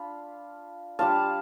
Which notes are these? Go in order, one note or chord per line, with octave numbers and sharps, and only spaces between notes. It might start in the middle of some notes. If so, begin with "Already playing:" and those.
Already playing: D4 F4 F5 B5
G3 D4 F4 F5 A5